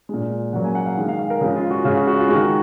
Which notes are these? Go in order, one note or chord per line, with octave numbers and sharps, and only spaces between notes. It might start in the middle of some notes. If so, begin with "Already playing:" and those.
A#2 G#3
C#3 F#3 A#3 F#5
G#5
F#5
F5
D#3 G#3
F5
F5
A#4
C#3 F3 G#3 G#4
F4
F#4
C#3 G#3 F4
F#4
F#4
F4
D#3 G#3 F#4